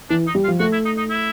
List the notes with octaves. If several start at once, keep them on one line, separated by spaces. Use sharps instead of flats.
E3 D4
D#4
G3
F4
F3
A3 F#4
E4
D#4
D#4
E4